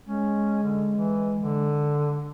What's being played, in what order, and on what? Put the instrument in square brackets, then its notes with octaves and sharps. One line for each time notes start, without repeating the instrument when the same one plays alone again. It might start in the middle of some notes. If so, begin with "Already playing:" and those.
[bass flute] G#3 [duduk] C#4
[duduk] D3
E3
D3